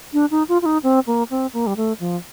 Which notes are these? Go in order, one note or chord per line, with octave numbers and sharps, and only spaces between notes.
D4
D#4
F4
F4
D#4
C4
A#3
C4
A#3
G3
A3
F3